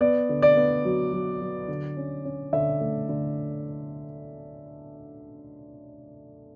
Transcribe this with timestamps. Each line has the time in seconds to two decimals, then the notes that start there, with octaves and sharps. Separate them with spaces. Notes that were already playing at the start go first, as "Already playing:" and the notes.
0.01 B3 D5
0.29 D3
0.42 D5
0.56 B3
0.85 F#3
1.13 F#3
1.41 F#3
1.68 D3
1.97 C#4
2.25 C#4
2.53 D3 E5
2.81 A3
3.09 D3